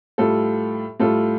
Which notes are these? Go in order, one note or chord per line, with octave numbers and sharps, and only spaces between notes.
A2 G3 F4 A4
A2 G3 F4 A4